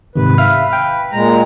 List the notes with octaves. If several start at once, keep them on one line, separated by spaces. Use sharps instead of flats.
G#2 C3 D#3 B4
E5 F5 F6
G5
A#2 G#3 A#5